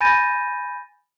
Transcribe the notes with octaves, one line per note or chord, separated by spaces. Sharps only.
G#5 B5 G6 A6 A#6 D#7